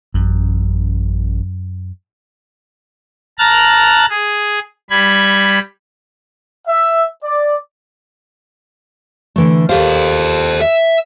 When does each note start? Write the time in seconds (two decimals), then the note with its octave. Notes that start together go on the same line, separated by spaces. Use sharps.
0.14 A1 F#2
3.39 A5 A#5 F6 F#6 A6
4.10 G#4
4.90 G3 B5 G#6
6.67 E5
7.24 D5
9.36 D3 E3 A3
9.69 D#2 G4 A4 C5 F5
10.61 E5